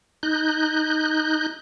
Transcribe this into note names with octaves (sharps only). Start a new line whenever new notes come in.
D#4 F#6 G6